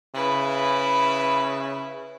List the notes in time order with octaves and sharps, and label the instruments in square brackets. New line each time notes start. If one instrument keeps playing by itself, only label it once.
[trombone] C#3 [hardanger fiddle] E4 B4